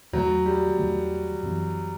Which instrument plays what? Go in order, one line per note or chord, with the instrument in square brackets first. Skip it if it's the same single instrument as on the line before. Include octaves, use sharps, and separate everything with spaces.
[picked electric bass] E2 D#3 A3 [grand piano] F#3
[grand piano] G3
[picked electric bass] E2 D#3 A3
F#2 E3 B3